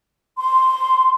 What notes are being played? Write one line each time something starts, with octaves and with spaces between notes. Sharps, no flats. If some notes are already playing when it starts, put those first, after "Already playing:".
C6